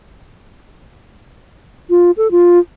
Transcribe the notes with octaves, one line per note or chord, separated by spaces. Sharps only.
F4
A4
F4